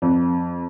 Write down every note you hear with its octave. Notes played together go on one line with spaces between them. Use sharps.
F2